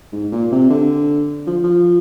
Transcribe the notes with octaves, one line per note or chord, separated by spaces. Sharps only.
G#2
A#2
C3
D3
F3
F3